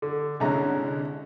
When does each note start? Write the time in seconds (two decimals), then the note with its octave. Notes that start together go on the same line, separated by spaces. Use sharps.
0.02 D3
0.40 C2 D3 G#3 C#4 E4 A#5